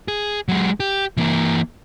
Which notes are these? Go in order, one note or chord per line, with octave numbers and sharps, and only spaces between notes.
G#4
F#3 G#3
G4
E3 A#3